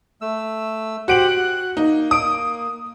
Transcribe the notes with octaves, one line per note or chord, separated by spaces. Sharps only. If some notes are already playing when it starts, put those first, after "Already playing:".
A3 E6
F#4 G4 C5 F#5 D7 F#7
F#6
A#3 D#4
D#6 D7